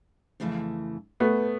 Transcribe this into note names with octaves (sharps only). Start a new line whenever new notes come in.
F2 C#3 E3 A3
A3 B3